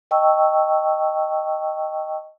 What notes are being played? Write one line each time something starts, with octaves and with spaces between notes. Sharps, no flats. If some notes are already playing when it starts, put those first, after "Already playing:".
D#5 G5 A5 C#6 E6